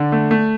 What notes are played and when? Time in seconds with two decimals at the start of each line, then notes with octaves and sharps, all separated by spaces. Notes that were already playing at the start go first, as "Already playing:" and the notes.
Already playing: D3 D5
0.12 A3
0.31 A3